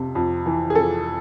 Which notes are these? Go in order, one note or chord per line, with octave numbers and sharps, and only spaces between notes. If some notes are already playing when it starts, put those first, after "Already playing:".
Already playing: F2 C3
F2
E3
G#4
F2 A4